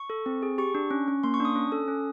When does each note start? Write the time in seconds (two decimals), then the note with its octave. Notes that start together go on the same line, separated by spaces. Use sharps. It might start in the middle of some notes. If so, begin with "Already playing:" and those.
Already playing: C#6
0.10 A4
0.26 C4
0.43 G#4
0.58 G4 C#6
0.75 D4
0.91 C#4
1.08 C#4
1.23 A#3 C6
1.34 C#6
1.40 D4
1.45 D#6
1.55 C#4
1.72 A4
1.88 C#4